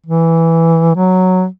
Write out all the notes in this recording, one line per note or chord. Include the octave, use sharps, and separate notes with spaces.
E3
F#3